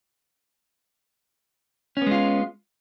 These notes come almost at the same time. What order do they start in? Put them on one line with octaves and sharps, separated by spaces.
C#4 B3 G#3 F4